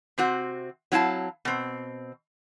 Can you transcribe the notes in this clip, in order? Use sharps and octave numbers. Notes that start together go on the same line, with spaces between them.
C3 C4 F#4
F#3 C4 E4 F5 A5
B2 C4